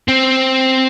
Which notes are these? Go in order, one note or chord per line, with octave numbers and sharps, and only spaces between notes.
C4